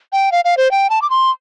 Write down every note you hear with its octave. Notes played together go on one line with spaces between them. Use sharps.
G5
F5
F5
C5
G5
A5
D6
C6